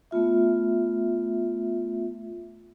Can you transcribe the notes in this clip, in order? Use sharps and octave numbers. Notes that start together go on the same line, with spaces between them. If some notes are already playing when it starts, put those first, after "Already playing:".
A3 B3 F4 E5